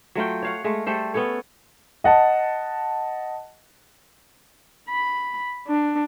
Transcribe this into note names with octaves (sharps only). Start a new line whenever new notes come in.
F#3 A3 F4 G5
C#5 F5 F#5
G#3 A3
G3 A3 A4 C5
B3 C#4 A4 C#5
D#5 F#5 A5
B5
D4